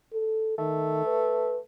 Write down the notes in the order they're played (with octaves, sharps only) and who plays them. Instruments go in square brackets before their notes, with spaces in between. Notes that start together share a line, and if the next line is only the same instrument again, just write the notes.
[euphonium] A4
[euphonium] D#3 [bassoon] A3
[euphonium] B4